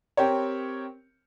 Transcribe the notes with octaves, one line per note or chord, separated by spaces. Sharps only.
C4 G4 A#4 C#5